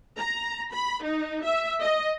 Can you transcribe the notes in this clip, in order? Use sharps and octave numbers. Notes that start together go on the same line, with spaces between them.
A#5
B5
D#4
E5
D#5